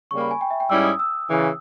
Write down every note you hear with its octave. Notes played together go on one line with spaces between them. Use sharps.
C#3 G3 A#3 C#6
B5
G#5
G5
E5
G5
G#2 G3 C#4 E4 E6
D#6
E6
C#3 E3